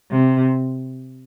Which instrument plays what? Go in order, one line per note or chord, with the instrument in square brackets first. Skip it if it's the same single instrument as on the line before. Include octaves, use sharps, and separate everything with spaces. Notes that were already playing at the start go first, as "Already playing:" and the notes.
[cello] C3